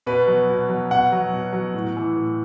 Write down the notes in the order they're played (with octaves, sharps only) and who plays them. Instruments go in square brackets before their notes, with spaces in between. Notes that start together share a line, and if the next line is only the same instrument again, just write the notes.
[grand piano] B2 B4
F#3
B2
F#3
B2 F#5
F#3
B2
F#3
A2
E3
A2